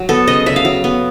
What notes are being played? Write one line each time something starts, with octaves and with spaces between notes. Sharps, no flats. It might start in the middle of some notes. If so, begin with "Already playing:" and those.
Already playing: F#3
B3 A4
C#3 D#5
C#3 E5
F5
F#3
B3